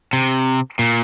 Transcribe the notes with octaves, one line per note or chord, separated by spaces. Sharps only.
C3
A#2